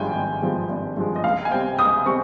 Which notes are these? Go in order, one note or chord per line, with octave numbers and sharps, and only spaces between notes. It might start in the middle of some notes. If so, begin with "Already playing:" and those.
Already playing: G#1 G2 F3 G#3 G5 G#5
G#1
G2 F3 G#3
G#1
G2 F3 G#3
D#5
C#2 F5
G#5
C3 G3 C4 G5
C#2 D#6
C3 G3 C4 C#6